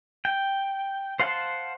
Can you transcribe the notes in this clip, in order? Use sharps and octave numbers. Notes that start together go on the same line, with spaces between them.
G5
C5 F5 F#5 A5 C6